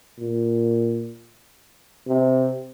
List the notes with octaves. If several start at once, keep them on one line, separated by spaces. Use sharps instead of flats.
A#2
C3